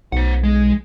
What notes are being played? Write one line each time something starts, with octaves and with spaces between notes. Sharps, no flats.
B1 C5 F#5
G#3